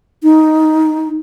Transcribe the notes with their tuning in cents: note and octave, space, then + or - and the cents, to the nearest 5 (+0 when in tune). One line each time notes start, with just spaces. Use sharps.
D#4 +10